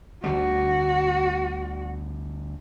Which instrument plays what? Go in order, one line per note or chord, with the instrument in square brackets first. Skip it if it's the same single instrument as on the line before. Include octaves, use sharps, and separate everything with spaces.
[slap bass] D2 D3 G3 [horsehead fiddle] F#4